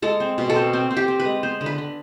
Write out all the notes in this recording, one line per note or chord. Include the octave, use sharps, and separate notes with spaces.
G#3 A4
C4
B2
A4
C4
C4
C4
G4
C4
B4
G#3
B3 C5
D3
B4
D3